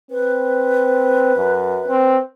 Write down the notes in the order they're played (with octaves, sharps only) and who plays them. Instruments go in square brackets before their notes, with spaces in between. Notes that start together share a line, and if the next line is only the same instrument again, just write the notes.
[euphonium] C4 [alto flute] B4
[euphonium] F#2
C4